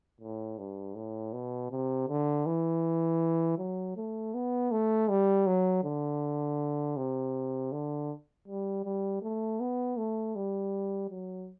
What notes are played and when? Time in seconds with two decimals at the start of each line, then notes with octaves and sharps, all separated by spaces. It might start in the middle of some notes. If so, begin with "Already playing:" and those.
0.21 A2
0.58 G2
0.95 A2
1.33 B2
1.71 C3
2.09 D3
2.46 E3
3.58 F#3
3.97 A3
4.34 B3
4.72 A3
5.10 G3
5.47 F#3
5.84 D3
6.97 C3
7.72 D3
8.48 G3
8.85 G3
9.22 A3
9.60 B3
9.98 A3
10.36 G3
11.10 F#3